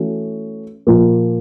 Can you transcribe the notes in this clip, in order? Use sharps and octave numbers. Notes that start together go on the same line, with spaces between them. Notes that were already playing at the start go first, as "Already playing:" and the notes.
Already playing: E3 A3 C#4 F#4 A4
A#2 F3 A#3